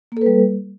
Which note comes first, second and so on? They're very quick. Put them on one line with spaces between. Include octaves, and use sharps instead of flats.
A#3 A4 B4 G3